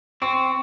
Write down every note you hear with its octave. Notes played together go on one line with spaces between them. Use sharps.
C4 C#6